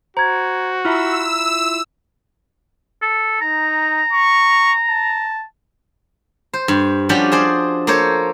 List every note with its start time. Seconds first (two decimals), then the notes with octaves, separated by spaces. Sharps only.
0.17 F#4 C5 A#5 G#6
0.85 E4 F4 E5 A#5 B5 E6 F6
3.02 A4
3.41 D#4 A#5
4.13 C#6
4.89 A5
6.53 C5
6.68 G2
7.09 F3 G3 C#4 D4 F#4 G4
7.32 G#4 C5 D5
7.87 A#3 A4 C5 C#5